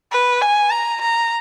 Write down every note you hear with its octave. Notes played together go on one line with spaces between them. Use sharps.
B4
G#5
A#5
A#5